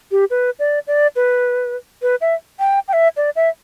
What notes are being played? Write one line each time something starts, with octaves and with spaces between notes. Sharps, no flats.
G4
B4
D5
D5
B4
B4
E5
G5
G5
E5
D5
E5